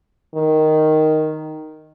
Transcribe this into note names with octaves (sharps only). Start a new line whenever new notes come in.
D#3